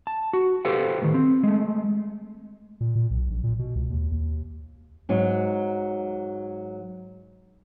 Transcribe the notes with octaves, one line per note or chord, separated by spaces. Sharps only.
A5
F#4
G4 A4 B4 C5 F5 G5
A2 D#3
C4
G#3 A3
A#2
A#2
B1
A#1
A#2
B2
C#2
D#2
D#2
G#2 F#3 D#4